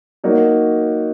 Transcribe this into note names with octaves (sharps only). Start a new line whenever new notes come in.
F#3 A#3 D#4 F#4